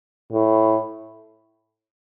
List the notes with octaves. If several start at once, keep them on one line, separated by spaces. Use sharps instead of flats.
A2